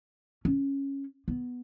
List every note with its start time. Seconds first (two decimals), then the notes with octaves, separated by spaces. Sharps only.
0.45 C#4
1.28 B3